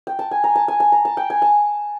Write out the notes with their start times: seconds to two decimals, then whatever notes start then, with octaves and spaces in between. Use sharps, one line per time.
0.07 G5
0.19 A5
0.31 G#5
0.44 A#5
0.56 A5
0.68 G#5
0.80 A5
0.92 A#5
1.05 A5
1.17 G5
1.30 G#5
1.42 A5